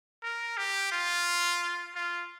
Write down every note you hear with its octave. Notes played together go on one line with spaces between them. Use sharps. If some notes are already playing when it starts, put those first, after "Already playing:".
A#4
G4
F4
F4